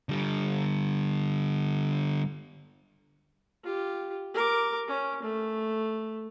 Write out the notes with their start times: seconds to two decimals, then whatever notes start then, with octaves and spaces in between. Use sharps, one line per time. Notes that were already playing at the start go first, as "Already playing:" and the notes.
0.09 D3 G3
3.63 F4 G4
4.34 A#4 D6
4.88 C#4
5.23 A3